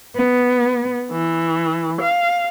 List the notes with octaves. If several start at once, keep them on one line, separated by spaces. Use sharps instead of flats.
B3
E3
F5